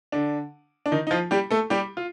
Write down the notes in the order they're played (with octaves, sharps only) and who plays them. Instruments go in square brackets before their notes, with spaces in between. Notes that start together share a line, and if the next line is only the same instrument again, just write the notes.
[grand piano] D3 D4
D4
D#3 D#4
D#4
F3 F4
G3 G4
A3 A4
G3 G4
F4